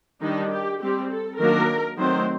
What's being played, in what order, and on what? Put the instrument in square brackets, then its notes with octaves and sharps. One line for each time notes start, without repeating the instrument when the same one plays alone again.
[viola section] D#3 G3 D4 D#4
G4
G3 C4 G4
A4
D#3 F#3 A#3 D4 A#4
D#3 F#3 A3 C4 C5